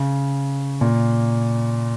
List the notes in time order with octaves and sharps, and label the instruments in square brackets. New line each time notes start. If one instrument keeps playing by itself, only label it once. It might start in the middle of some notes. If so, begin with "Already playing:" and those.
Already playing: [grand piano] C#3
A#2